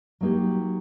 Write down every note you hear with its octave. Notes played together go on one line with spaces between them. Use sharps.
F#3 A#3 D#4 G4